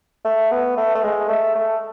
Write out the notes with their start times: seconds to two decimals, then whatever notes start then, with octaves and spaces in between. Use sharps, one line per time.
0.25 A3
0.51 B3
0.77 A3
0.95 A3
1.03 G#3
1.29 A3
1.55 A3